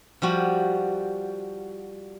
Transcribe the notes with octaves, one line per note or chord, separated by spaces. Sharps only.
F3 G3 F#4